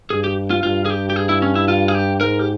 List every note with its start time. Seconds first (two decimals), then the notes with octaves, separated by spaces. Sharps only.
0.10 G2 G#4
0.24 G4
0.50 F4
0.63 G2 F4
0.86 G#4
0.90 G4
1.10 G4
1.16 G#4
1.29 E4
1.42 C#4
1.55 E4
1.68 F4
1.88 G#4
1.95 G4
2.21 G#2 A#4
2.39 G4